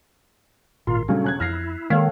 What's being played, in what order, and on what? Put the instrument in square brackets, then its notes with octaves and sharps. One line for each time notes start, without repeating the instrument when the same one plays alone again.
[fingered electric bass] G#1 [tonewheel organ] A#2 F4 [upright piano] A#4 C6
[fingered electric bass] A#2 G3 D4 [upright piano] C#3 F#3 A3 [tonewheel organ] C#4
[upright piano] E1 F#6 G#6
[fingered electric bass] F2 [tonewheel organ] E4 [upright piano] F6 A#6 C7
[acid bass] D#3 [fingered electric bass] G#3 A#3 [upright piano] A4 C#5 F5